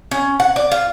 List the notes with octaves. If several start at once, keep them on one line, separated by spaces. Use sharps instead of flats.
C#4
F#5
D5
F4